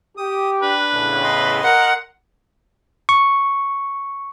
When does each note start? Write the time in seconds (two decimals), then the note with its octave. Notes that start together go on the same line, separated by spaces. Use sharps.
0.17 G4 D#6
0.62 D4 B4
0.93 E2 A2 C#3
1.24 D#5 C6
1.64 A#4 F#5
3.09 C#6